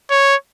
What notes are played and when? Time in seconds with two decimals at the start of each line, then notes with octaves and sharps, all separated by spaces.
0.11 C#5